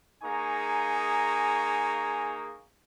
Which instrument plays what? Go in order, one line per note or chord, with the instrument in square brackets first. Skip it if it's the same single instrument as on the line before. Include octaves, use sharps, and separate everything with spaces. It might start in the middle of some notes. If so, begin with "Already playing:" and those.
[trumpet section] A#3 D#4 G#4 G#5 A#5 C#6